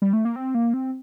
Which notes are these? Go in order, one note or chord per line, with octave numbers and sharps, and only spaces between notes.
G3
A3
A#3
C4
A#3
C4